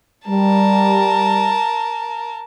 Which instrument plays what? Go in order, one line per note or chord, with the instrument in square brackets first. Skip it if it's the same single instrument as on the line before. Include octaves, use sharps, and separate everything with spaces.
[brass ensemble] G3 [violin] A#4 A5